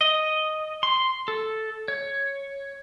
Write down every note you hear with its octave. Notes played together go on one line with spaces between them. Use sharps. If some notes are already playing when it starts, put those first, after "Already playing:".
D#5
C6
A4
C#5